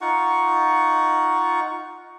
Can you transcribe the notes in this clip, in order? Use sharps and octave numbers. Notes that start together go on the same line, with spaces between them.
D#4 F4 F#5 C#6